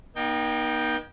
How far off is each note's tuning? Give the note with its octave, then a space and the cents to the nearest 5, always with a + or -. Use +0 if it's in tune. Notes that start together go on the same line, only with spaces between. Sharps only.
A#3 +45 D#4 -15 G5 +0